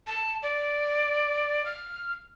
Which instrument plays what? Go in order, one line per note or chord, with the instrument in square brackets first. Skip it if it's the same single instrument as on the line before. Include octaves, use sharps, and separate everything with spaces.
[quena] A5
D5
F6